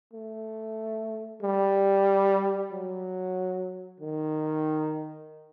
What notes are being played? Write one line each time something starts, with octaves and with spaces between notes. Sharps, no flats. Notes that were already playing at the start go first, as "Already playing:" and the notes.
A3
G3
F#3
D#3